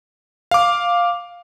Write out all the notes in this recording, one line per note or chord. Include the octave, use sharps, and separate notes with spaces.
F5 D6